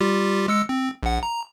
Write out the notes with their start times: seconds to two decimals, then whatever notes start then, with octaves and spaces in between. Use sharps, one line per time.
0.01 G3 F4 G4
0.48 G#3 E6 C#7
0.69 C4
1.03 A#1 F#5
1.23 A#5